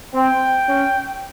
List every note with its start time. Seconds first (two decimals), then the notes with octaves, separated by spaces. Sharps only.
0.14 C4 G5
0.68 C#4